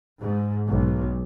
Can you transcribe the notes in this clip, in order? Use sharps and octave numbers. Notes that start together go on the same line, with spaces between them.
G#2
B1